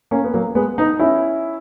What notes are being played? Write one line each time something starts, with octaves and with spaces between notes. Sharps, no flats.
A#3 C#4
B3
F#3 A#3
G#3 B3
B3 D#4
C#4 E4